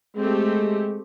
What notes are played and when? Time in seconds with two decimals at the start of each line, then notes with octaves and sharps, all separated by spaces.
0.17 G#3 A3 C4 G4